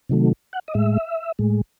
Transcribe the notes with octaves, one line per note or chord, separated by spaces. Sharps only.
C3 D#3 F#3 A3
F#5
D#5
A2 G#3 E5
A2 G#3